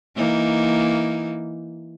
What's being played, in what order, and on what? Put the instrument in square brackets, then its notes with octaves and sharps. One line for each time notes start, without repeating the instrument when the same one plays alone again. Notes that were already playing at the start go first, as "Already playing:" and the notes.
[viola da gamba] E3 A#3 D#4